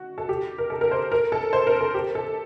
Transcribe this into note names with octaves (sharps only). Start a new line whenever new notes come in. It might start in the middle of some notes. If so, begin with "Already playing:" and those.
Already playing: F#4
A4
G4
A#4
A4
A#4
C5
A#4
A4
C5
A#4
A4
G4
A4